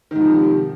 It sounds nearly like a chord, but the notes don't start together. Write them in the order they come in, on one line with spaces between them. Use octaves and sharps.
D#3 G#2 F3 C3